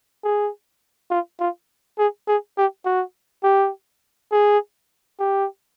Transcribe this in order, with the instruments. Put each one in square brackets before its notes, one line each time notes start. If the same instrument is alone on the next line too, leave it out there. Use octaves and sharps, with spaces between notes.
[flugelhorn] G#4
F4
F4
G#4
G#4
G4
F#4
G4
G#4
G4